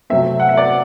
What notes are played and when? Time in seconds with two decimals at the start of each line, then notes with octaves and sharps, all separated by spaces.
0.10 C3 F#3 A3 C4 E5
0.40 F#5
0.49 E5
0.57 D5